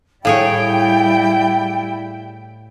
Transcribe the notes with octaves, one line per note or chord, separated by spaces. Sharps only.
A2 G3 E4 G#4 C#5 F5 G5